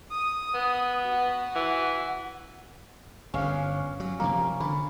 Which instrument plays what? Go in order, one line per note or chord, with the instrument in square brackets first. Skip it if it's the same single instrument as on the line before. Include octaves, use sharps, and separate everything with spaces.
[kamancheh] D#6
[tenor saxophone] B3
[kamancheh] F#4 F#5
[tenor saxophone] E3
[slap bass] G1 G2 [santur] C#4 F5
[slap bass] F#3
[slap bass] C3 F3 G3 [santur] A#3
[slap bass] D3 [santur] B5